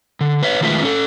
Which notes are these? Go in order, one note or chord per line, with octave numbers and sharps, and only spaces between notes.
D3
B4 C#5 E5
D#3 F3 G#3 A3 B4 E5
C#4 A4